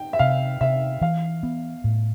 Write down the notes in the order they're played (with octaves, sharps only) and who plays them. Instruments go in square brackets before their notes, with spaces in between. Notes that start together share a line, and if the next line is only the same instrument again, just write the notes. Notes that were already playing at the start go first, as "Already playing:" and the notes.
Already playing: [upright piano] G5
E5
[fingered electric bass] C3 [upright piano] F5
[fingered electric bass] C3 [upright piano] E5
[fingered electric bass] E3 [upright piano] F5
[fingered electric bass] B3
A2